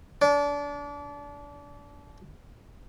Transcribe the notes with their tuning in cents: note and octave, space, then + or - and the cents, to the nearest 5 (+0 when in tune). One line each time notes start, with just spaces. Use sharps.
D4 -30